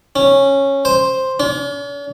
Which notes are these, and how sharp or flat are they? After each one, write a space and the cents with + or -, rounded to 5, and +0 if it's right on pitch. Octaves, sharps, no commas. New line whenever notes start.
C#4 -10
C5 +0
C#4 +45